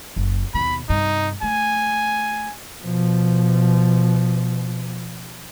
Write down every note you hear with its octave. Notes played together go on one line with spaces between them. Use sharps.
F#1
D#2 B2 B5
G2 C3 D#4
A3 G#5
B2 F3